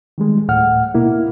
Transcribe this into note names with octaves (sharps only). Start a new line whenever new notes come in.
D#3 G3 G#3
D2 A2 F#5 F6
B2 A#3 E4